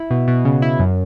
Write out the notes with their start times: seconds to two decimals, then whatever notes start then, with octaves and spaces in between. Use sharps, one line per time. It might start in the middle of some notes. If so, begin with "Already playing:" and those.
Already playing: E4
0.11 B2
0.28 B2
0.45 C#3
0.62 E4
0.79 F#2